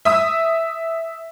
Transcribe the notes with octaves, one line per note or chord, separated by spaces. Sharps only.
E5 D#6 E6